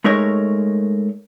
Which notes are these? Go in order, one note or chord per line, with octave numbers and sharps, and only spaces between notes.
G#3 A3 D#4 A#4 C#5